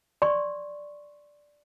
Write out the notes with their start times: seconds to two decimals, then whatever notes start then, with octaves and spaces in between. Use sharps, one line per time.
0.22 D5 C6 C#6